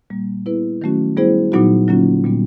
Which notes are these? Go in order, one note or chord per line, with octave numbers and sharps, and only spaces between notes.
A#2 G3 A#3
B3 E4 G#4 B4
D#3 F#3 A3 C#4 F#4
G3 B3 E4 G#4 C5
A#2 F#3 B3 D#4 F#4
D3 F#3 A#3 C#4 F4
A#2 G3 B3